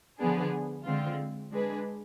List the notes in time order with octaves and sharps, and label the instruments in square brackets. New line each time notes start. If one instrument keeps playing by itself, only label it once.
[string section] D3 F3 B3 D4 G#4
D3 G#3 C4 F4
G#3 D4 G#4 B4